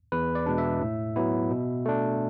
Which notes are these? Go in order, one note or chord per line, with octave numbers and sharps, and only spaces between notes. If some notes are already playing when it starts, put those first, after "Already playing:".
E2 B4
D5
B2 G#3 D4
E5
A2
F#3 B3 E4
B2
A3 D4